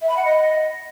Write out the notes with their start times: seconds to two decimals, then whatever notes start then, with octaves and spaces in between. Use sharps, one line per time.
0.01 E5
0.08 B5
0.16 F#5
0.24 D#5